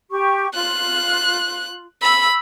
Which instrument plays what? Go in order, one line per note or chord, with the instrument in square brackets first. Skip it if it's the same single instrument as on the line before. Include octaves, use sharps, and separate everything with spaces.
[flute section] G4 C#6
[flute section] F4 [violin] F#6
[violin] B5 [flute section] E6